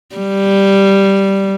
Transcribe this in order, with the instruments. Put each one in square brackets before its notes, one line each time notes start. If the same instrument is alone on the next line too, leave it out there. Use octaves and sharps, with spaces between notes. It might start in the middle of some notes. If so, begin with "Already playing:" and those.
[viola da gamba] G3